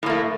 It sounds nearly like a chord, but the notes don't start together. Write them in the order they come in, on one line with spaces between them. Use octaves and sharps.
A2 A#3 A3